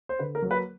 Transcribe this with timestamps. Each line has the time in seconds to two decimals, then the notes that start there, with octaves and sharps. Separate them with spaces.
0.09 C5
0.19 D3 B4
0.35 A#4
0.42 F#3 A#3
0.51 B4